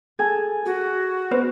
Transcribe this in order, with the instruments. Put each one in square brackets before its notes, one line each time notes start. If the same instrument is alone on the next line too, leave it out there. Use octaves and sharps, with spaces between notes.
[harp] G#4 A4 G#5
[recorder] F#4 [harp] G#4
[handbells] B3 B4 C5